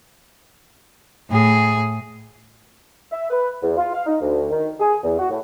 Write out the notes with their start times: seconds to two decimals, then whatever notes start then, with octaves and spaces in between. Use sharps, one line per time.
1.30 A2 G#4
3.11 E5
3.29 B4
3.62 E2
3.77 F4
3.93 F5
4.06 D#4
4.20 D2
4.50 D#3
4.80 G#4
5.04 E2
5.18 F#4
5.30 A2